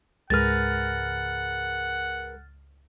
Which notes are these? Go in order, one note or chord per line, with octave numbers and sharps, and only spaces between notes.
C#2 G#2 G#3 A#4 B4 F#5 F6 A6